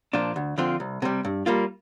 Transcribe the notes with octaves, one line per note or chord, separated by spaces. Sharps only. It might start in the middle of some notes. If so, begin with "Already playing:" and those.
A#2 F3 D4 F4
D2
D3 F3 C4 F4
C2
C3 G3
G2
G3 A#3 F4